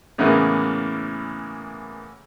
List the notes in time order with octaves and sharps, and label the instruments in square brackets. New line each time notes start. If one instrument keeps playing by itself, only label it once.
[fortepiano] A2 C#3 E3 A#3 B3